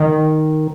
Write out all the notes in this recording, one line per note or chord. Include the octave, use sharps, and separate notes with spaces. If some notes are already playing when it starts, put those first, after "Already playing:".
Already playing: D#3